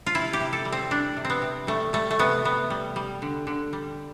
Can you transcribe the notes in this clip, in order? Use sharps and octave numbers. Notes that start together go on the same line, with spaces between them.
F4
C3 E4
G4
C3
A4
G3
C4
G3 D4
C3
C4
B3
C3
G3 A3
G3 A3
A3
C3 B3
C3 B3
G3
G3
D3
D3
G3